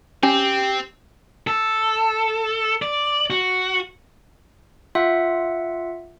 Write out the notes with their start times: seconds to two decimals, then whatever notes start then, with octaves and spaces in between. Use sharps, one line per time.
0.23 C4 C#4 G4
1.47 A4
2.82 D5
3.30 F#4
4.95 F4 E5 F#5